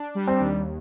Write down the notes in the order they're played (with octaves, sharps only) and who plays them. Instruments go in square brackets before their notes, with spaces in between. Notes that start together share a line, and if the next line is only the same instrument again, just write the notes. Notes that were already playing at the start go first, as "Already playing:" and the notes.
Already playing: [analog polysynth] D4
G3
[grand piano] C4
[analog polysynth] D#2